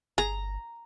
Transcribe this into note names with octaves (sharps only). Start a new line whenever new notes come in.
G1 G#4 A#5